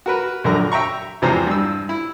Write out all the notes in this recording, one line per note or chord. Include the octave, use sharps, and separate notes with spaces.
F#4 A#4 B4
A#1 F#2 D3 A#4 A#5
E5 G5 A#5 C#6
G#1 E2 C3 F3 C5 A#5
G2 E6
E4